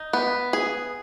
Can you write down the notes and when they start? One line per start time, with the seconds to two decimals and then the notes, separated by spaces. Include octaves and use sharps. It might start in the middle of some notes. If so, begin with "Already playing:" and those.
Already playing: D#4
0.13 B3
0.53 G#4